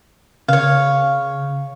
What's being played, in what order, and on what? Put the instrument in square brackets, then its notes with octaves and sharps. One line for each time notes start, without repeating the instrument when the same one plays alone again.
[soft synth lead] C#3 [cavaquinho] C#5 F5